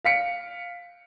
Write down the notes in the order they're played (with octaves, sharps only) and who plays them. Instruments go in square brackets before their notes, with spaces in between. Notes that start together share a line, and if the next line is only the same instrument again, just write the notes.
[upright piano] F5 B6 C#7 D7